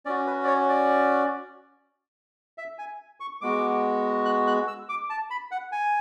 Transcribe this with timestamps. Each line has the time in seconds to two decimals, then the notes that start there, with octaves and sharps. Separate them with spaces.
0.05 C#4 F#4 D5
0.27 B4
0.44 D5
0.47 C#5
0.69 D5
2.58 E5
2.79 G#5
3.20 C#6
3.41 G#3 B3 F#4 D6
4.25 F#6
4.47 F#6
4.67 E6
4.89 D6
5.10 A5
5.30 B5
5.51 F#5
5.72 G#5